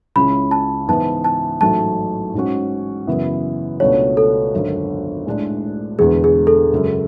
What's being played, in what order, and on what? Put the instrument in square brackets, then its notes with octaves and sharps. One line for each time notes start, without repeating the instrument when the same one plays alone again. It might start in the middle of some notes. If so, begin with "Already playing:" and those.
[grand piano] C#2 C#3 G#3 C#4 E4 [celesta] B5
[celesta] A5
[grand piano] G#2 E3 B3 [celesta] A5
[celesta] A5
[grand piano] A1 G#2 F#3 A3 [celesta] A5
[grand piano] G#2 G#3 C#4 F#4
F#2 C#3 E3 B3 E4
[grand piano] C#2 B2 A3 D4 F#4 [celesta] C#5
[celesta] A4
[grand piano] G#1 F#2 D3
A2 G#3 D4
[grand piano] E1 E2 D3 G#3 B3 [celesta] G#4
[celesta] G#4
A4
[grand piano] F#2 C#3 G#3